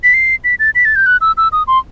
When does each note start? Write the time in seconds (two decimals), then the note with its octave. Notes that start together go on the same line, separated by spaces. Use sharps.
0.04 B6
0.14 C7
0.44 B6
0.59 A6
0.75 B6
0.85 A6
0.96 G6
1.06 F#6
1.21 E6
1.37 E6
1.52 D#6
1.68 C6